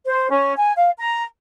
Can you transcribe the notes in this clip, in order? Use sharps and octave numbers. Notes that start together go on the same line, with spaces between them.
C5
C#4
G#5
F5
A#5